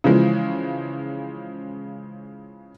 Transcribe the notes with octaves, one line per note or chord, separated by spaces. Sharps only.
C#3 E3 F3 G#3